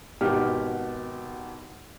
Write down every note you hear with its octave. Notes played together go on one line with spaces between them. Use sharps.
G#1 B2 G4 F6